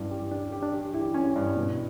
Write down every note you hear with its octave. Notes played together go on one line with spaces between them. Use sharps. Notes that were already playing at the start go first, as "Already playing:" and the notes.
Already playing: G2 C#4 D4 E4 G4
G4
D4 G4
G4
D4
G4
E4 G4
C#4
G2
B2